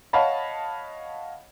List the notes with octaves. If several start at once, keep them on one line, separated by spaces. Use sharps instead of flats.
C#5 D#5 F5 F#5 A5 B5